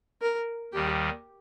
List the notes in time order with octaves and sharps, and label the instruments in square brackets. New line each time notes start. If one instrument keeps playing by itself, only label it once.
[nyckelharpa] A#4
[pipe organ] D#2 D#3 G3 [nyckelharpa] G4